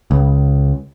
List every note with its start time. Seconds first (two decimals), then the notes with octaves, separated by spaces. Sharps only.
0.11 C#2